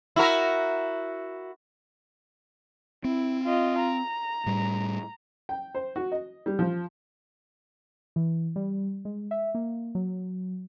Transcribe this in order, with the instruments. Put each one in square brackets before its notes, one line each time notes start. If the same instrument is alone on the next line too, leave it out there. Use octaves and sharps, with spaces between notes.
[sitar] E4 F#4 A#4
[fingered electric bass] C4 [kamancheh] E4
[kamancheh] F4 D#5
A#5
[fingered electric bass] A2 G3
[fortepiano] G5
C5
F#4
D#5
G3
F3
[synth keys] E3
G3
G#3
E5
A#3
F#3